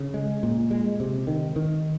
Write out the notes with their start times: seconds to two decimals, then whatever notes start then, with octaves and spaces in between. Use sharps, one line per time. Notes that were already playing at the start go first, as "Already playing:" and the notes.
Already playing: C#3
0.14 G#3
0.43 A#2
0.71 G#3
1.00 C3
1.27 D#3
1.56 D#3